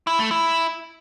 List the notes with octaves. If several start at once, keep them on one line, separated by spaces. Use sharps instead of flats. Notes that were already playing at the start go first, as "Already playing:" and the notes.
E4
A3
E4